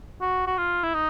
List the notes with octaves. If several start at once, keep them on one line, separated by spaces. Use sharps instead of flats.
F#4
F#4
F4
E4
D#4